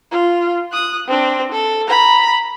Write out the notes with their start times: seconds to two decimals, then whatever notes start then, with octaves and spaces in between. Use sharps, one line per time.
0.11 F4
0.72 D#6 F#6
1.08 C4 D4
1.52 A4
1.87 A#5 B5